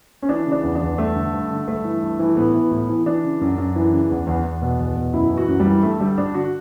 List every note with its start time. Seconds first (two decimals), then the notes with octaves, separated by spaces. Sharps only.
0.22 C#4
0.29 E3 D4
0.46 C#3
0.52 D4
0.63 E2
0.75 D4
0.81 E2
0.98 G2 A3
1.16 D3
1.33 G2
1.51 D3
1.67 G2 A3
1.84 E3
2.02 G2
2.19 E3
2.36 A2 B3
2.54 E3
2.71 A2
2.89 E3
3.06 E3 D4
3.24 C#3
3.41 F#2
3.58 F#2
3.76 E3
3.92 C#3
4.10 E2
4.27 E2
4.44 E2
4.62 B2
4.79 E2
4.96 B2
5.14 F#2 E4
5.31 E3
5.37 F#4
5.48 F#2
5.60 G3
5.65 E3
5.83 G2 A3
6.00 D3 G3
6.17 G2 D4
6.34 D3 F#4